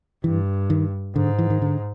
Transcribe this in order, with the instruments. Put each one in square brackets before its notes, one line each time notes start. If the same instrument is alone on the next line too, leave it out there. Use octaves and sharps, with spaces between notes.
[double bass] G2 [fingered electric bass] E3
[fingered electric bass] D#3
[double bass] G#2 [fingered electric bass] D3
[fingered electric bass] E3
D#3
D3